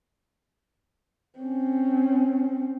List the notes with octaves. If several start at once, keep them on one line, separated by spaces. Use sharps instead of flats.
C4 C#4